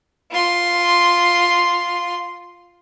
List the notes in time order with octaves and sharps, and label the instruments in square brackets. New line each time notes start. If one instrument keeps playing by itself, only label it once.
[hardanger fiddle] F4 C6